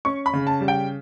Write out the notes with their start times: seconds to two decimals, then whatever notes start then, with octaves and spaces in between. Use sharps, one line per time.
0.05 C#4 C#6
0.26 B5
0.33 C#3
0.47 A5
0.61 G3
0.68 G5